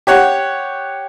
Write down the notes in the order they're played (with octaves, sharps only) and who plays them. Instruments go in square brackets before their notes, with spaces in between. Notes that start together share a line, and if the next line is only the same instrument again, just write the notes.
[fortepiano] G4 C#5 F#5